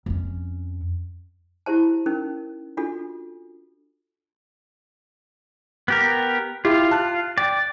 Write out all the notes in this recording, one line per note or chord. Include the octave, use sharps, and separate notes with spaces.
F2 C#4
E4 G4 C5 A5
C#4 D#4 A#4
D4 F4 F#4 A4
B3 G4 A#4
E4 F4 G4
A5 F#6
D5 G5